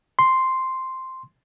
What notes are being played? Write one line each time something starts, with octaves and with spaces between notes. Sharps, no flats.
C6